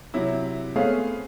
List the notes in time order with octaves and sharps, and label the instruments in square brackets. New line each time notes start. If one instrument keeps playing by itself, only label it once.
[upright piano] C3 F#3 E4
A3 B3 C4 G#4 C#5 F5